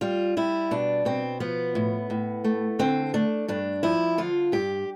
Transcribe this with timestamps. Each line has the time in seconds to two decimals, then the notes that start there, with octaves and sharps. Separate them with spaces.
0.01 G3 F4
0.37 G3 E4
0.71 B2 D4
1.05 B2 C4
1.40 F3 B3
1.75 A2
2.10 A2
2.44 A3
2.79 D3 C4
3.14 A3 D4
3.48 G2 D4
3.83 F3 E4
4.18 D3 F4
4.52 G2 G4